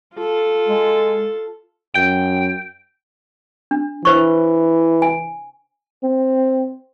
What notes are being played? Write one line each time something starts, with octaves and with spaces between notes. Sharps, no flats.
F4 A4
G#3
F#2 G5
D4
E3 B4 C5 C#6
G#5
C4